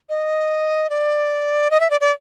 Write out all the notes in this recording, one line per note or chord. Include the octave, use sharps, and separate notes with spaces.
D#5
D5
D#5
E5
D5
D5